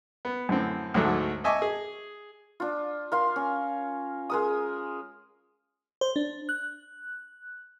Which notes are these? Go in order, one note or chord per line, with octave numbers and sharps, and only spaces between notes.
B3
F#2 A2 D3 C4
D2 G#2 F#3 A3
D#5 E5 G#5 A5 C#6 D6
G#4
D4 F4
A#4 F5 C6
C#4
G#3 A#4 D#6
C5
D4
F#6